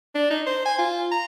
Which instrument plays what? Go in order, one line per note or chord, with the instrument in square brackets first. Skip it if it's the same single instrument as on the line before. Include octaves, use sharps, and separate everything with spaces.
[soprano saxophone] D4
D#4
C5
G#5
F4
A#5